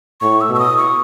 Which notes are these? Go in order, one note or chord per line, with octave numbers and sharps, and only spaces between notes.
A2 C#6
E6
B2
E6
D#6
C#6